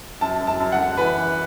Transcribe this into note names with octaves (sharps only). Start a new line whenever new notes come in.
F#2 A5
F#2
A5
F#2
F#5
F#2
E3 B4
E3